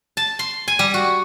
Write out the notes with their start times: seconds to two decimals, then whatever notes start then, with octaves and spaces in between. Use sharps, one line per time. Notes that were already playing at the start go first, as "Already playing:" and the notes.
0.17 A5
0.39 C6
0.68 G#5
0.79 G3
0.94 F#4